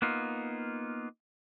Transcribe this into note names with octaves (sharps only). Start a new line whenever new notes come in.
A#3 B3 D#4 F4